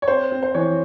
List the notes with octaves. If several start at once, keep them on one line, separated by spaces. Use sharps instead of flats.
C#5
C4 C5
C4
C5
E3 C#5